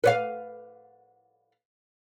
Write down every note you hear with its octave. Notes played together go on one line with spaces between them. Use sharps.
B4 C#5 F5